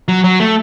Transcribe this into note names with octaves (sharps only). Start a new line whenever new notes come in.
F#3
F#3
A3